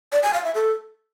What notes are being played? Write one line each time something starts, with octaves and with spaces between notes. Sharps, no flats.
D5
G#5
F5
E5
A4